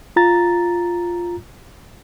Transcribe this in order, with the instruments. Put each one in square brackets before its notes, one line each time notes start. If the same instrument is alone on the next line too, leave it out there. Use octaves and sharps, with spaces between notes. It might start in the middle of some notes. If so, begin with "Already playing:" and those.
[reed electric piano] F4 A#5 A6